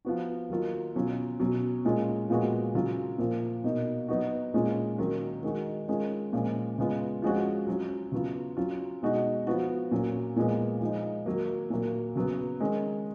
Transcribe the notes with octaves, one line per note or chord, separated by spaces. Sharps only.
F3 B3 F#4
D#3 F#3 A#3 F4
B2 F#3 C#4 F4
B2 F#3 C#4
A#2 G#3 C#4 F4
A#2 F3 G#3 B3 F#4
C#3 F#3 C#4 F4
A#2 F3 A#3 F4
B2 A#3 D#4
F#3 B3 D#4 F#4
A#2 G#3 C#4 F4
D#3 F#3 A#3 C#4
D#3 G#3 D#4 F#4
D#3 G#3 C#4 F4
A#2 F3 G#3 C#4
C#3 G#3 B3 F4
F3 G#3 C#4 F#4
F#3 C#4 F4
C#3 F#3 B3 F4
F#3 C#4 F4
B2 G#3 D#4 F#4
F3 B3 F#4
A#2 F#3 C#4
A#2 F3 G#3 B3
F3 G#3 D#4
D#3 F#3 A#3
A#2 F#3 A#3
C#3 F#3 B3
D#3 G#3 C#4